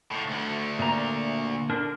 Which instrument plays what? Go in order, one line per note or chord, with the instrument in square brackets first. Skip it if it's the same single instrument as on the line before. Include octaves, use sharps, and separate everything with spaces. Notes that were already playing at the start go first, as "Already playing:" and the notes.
[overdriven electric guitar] A2 D3
D2 D3
[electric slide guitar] A#2 A#5
D3 D4 A#4